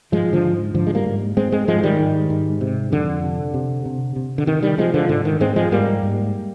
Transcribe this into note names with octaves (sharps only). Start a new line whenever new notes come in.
G#2 F3 G#3
D3 F3
G#2
G#2 D3 F3
G#3
G3 A#3
G#2
G#2 G#3 C4
G#3 C4
G#2 F3 G#3
D#3 G3
G#2
G#2
C3
F2 D3
C3
C3
C3
C3
D3
C3 D#3
D#3 G3
C3 F3 G#3
D3 F3
G#2 D3
D#3
G#2 G#3 C4
F3 G#3
G#2 G3 A#3
G#2